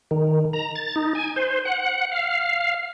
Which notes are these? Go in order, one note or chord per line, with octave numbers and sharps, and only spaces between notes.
D#3
A#5
A6
D#4
G#5
C5
F#5
F5